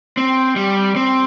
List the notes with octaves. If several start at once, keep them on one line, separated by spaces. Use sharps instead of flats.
C4
G3
C4